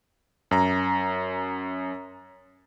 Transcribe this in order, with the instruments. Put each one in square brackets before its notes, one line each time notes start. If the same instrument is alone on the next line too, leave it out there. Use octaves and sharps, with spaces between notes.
[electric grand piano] F#2 A#5